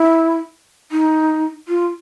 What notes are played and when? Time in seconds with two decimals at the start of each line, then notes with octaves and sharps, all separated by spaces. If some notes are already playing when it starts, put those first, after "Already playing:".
Already playing: E4
0.92 D#4
1.68 F4